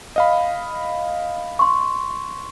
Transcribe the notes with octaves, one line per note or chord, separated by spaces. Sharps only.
D#5 F5 B5
C6 C#6